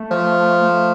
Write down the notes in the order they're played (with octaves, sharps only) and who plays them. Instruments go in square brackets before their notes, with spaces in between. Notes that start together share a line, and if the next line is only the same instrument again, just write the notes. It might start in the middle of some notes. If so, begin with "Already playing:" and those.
Already playing: [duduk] A3
[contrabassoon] F3
[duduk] A3